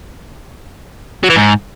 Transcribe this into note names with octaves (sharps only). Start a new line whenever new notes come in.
F#3
E3
G#2